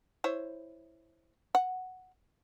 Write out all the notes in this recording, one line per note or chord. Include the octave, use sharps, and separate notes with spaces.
E4 C5 C#5
F#5